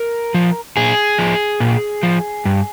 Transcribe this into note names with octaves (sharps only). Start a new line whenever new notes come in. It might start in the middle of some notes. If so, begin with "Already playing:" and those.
Already playing: A#4
F3
A#2 G#4
F3
A#2
F3
G2